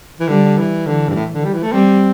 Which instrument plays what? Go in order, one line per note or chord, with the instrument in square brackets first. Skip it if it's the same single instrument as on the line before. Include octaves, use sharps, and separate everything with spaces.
[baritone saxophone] E3
[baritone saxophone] D3 [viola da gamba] G3
[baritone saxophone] E3
[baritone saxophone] D3 [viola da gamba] E3
[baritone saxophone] G2
A2
D3
G3
E3
A3
[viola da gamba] G3 [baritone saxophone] C4